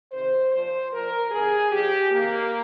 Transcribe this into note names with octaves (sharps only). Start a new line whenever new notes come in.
C3 D#3 C5
A#2 F3 C5
A#2 F3 A#4
C3 D#3 G#4
A#2 F3 G4
C3 D#3 A#3